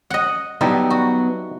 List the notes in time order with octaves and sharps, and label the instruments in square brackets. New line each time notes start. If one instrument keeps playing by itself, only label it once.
[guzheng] D#5 F#5
[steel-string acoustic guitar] F#3 B3 [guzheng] G3 [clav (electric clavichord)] D#4 E4 A5
[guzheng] F#4